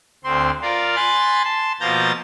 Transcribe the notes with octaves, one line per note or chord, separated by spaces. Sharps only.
D2 C4 C6
F4 A#4 D5 F5
G#5 B5 C6 F#6 A6
A5 C6
B2 F3 A#3 A#5 G6 A6